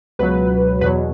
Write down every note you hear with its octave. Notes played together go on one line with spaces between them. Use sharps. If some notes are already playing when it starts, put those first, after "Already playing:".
C#2 B2 F#3 B4
E2 B2 F#3 B4